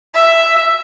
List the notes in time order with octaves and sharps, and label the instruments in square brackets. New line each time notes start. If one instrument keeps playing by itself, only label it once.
[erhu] E5